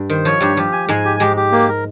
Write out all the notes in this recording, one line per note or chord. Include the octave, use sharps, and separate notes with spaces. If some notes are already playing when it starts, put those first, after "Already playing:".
Already playing: G2 G3
D#3 C5
F3 C#5
G2 G3 G4
F3 G4
G#5
G#2 G#3 G#5
G4
G#2 G#3 G4
G4
A#3
A#4